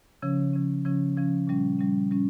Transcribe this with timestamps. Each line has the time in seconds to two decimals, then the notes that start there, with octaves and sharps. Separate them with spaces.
0.22 C#3 F3 C#4
0.53 C#3 F3 C#4
0.85 C#3 F3 C#4
1.17 C#3 F3 C#4
1.47 A#2 G3 C#4
1.79 A#2 G3 C#4
2.11 A#2 G3 C#4